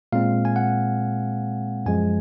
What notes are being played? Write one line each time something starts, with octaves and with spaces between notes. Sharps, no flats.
A#2 G#3 C4 F5
G#5
F#5
F#2 F3 G#3 G#5